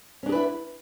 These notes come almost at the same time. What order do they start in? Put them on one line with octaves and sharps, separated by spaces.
C#4 D4 G#4 B4 E4